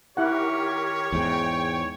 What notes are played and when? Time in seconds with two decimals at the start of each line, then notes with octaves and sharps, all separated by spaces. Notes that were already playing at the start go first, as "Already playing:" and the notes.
0.17 D#3 E4 G4 A#4 C#5 F#5
1.12 E2 G#2 G5